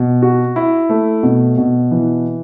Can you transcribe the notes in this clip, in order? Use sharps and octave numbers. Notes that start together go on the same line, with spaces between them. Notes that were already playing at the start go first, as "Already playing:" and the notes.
Already playing: B2
F#4
E4
A3
B2
B2
E3